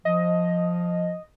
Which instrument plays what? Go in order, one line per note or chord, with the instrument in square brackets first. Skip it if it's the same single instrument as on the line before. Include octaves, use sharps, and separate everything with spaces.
[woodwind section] F3 [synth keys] D#5